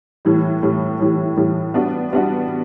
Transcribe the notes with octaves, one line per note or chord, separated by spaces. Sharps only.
A2 E3 G3
A2 E3 G3
A2 E3 G3
A2 E3 G3
G3 B3 D4 F#4
G3 B3 D4 F#4